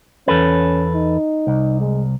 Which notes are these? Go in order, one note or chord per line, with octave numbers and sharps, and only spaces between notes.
E2 C#4 A4 B4
D#4
C2
G#3